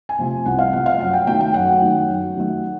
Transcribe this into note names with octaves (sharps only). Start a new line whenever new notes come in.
G#5
C3 F3 A3
C2 F#5
F5
C3 F3 A3 F#5
F5
F#2 F#5
G5
D#3 F#3 A3 G5
G5
F#2 F#5
D#3 F#3 A3
F#2
D#3 F#3 A3